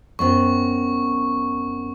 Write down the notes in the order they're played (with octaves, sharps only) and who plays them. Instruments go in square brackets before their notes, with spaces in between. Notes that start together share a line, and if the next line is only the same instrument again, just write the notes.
[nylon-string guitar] F#2 B3 C4 [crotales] C#6